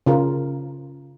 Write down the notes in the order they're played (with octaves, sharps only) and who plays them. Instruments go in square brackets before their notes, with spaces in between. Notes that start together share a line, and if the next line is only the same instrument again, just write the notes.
[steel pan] C#3 F4 A#4